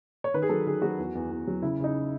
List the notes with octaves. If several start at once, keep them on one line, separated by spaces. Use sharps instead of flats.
C#5
D#3 B4
G#4
F#3 A4
D#3 G#4
F#3 F#4
E2
E2
E2
F#3
C#3 E4
C#3 D#4